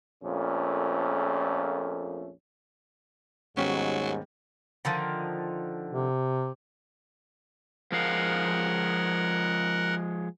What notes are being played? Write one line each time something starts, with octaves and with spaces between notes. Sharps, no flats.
A#1 F2 A#2 A3 C#4
D#2 G#2 D#3 F#3 G3 B3 C#4
D3 D#3 F3
C3
F3 G#3 A#4 F5 F#5